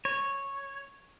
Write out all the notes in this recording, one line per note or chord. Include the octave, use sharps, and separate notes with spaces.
C#5